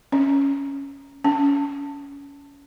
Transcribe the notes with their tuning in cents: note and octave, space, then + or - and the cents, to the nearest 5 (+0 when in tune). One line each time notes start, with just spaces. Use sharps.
C#4 +0
C#4 +30